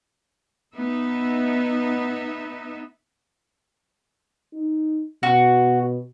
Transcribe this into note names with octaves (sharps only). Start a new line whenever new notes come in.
B3 D#4 E5
D#4
B2 F#4